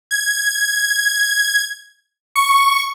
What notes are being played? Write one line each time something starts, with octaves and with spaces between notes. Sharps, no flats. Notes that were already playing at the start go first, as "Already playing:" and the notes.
G#6
C#6